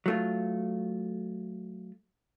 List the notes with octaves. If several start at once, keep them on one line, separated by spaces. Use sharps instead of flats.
F#3 A3 F4